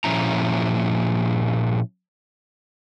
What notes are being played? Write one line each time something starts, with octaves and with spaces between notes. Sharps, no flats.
A#2 F3 C#4 E4 A#5